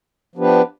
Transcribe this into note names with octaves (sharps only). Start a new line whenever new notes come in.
F3 B3 D4 G4 B4